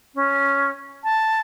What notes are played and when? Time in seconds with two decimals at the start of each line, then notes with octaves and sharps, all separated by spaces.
0.15 C#4
1.04 A5